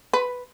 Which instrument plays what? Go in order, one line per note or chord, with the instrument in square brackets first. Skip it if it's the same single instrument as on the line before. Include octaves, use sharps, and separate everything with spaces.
[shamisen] B4